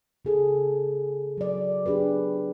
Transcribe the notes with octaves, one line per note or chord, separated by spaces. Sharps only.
C#3 G#4 A4
F#3 D5
D4 G4 G#4 B4